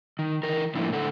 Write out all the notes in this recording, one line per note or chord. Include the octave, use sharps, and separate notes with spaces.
D#3
E3 A#4
A2 F3 A#3 D4 E4
A2 D3 A3 A4 F#5